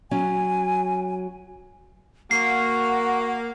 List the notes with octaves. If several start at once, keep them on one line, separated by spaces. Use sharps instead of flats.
F#3 C#4 G#5
A#3 F#4 F#5 C7